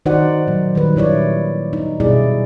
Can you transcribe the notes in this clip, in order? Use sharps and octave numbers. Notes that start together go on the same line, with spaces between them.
D#3 D#4 F#4 C5 D5 F#5
A#2 F#3
D#3 G3 B4
A#2 E4 C#5 D5
D#4
B2 G3 E4 G#4 D5